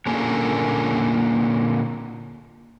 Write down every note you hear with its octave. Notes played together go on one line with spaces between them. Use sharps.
A#2 D3 A#3 C#4 G#4 A#4